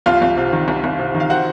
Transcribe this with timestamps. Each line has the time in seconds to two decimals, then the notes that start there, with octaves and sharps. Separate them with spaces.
0.06 C2 F4 F5
0.22 C2
0.37 C3
0.52 D#3
0.68 C2
0.84 C2
0.99 C3
1.14 D#3
1.20 F5
1.30 C4 F#4 F#5